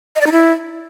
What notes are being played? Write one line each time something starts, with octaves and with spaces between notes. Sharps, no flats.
D#5
D5
D#4
E4